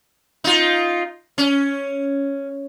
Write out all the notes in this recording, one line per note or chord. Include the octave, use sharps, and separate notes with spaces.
D#4 F4
C#4